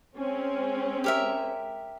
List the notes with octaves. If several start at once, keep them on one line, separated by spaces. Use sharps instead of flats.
G#3 C4 C#4
G4 A#4 E5